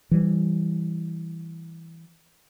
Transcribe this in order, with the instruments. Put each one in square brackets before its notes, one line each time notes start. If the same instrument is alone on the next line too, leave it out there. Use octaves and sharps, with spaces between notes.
[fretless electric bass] E3 G3